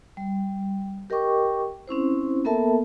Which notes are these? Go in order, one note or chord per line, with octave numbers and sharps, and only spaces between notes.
G3
G4 A#4 D#5 G5 C#6 D6
C4 C#4 E4 C5
A#3 B3 A4 A#4 E5 A5